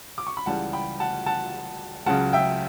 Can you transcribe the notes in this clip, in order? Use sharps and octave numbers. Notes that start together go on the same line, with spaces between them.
D6
C#6
B5
C#2 C#3 E3 G3 F#5 A5
G5 B5
F#5 A5
F#5 A5
C#2 C#3 F#3 F#5 A5
E5 G5